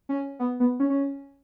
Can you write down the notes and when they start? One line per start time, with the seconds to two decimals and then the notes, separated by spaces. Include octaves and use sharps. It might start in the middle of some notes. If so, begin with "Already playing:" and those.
0.09 C#4
0.39 B3
0.60 B3
0.80 C#4
0.90 C#4